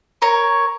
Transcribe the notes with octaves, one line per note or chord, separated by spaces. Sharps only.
A#4 C#5